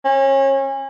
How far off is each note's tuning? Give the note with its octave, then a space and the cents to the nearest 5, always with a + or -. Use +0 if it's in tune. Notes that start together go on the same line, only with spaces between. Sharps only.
C#4 -30